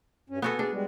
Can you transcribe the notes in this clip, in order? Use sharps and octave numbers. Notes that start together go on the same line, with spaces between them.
G2 C#4
B3 F#4 A4 G#5
D4 G#4
G3 G#3